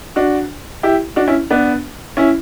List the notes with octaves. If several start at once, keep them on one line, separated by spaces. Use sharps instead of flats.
D4 F#4
E4 G4
D4 F#4
C#4 E4
B3 D4
C#4 E4